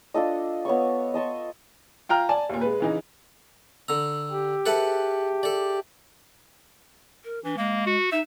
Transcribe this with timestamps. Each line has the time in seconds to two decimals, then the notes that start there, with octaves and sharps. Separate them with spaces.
0.14 D4 F4 A4 D#5
0.65 B3 C#5 D#5 C#6
1.14 D#5 A5 C6 C#6
2.09 F4 G5 A#5 F6
2.29 D5 G#5 A5
2.49 D#2 A#2
2.61 G#3 B4
2.80 C#3 E3 D#4
3.88 D3 A#5 E6
4.31 G4
4.66 G#4 A4 B4 E5 F#5 A5
5.43 A4 D5
7.24 A#4
7.44 E3 D4
7.57 G#3 A#3
7.86 F#4
8.12 D#4 E5